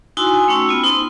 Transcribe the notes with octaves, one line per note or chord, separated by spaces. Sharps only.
D#4 E4 F#4 G#5 C6 D#6
A3 C#4 D#4 G5 E6
B3 F4
D#4 C5 C6